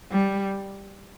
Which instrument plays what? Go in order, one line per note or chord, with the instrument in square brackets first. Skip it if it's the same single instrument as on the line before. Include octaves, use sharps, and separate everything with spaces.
[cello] G3